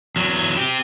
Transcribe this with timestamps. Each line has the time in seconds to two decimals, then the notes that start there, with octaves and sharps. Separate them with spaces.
0.16 E2 F#3
0.57 C4 G4